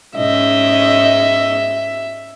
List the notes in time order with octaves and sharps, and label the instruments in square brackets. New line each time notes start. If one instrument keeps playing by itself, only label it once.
[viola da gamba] G#2 C#4 D#5 [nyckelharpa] E5